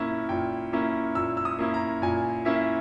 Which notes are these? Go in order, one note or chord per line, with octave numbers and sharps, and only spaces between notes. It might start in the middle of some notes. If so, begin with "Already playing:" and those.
Already playing: A#2 A#3 C#4 E4
A#2 G5
A#3 C#4 E4
A#2 E6
E6
D#6
A#3 C#4 E4
A#5
A#2 G#5
A#3 C#4 E4 E5